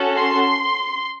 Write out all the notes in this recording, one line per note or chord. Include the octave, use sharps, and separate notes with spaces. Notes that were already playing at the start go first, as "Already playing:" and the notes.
Already playing: C#4 F#4 A4
C6